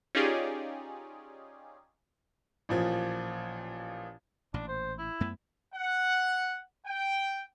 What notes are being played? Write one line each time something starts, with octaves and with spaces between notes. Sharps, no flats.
C#4 D#4 F4 G4 G#4 D5
A1 A#2 F3
A1 A#2 D4
C5
E4
F#2 A3 B3
F#5
G5